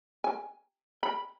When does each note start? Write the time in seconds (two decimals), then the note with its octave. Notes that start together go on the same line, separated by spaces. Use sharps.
0.24 G#5
1.03 B5